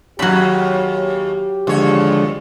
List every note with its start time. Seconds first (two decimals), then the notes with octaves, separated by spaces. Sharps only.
0.19 D#2 C#3 F#3 G4 B5
1.67 D#2 D3 F3 G#3 C#5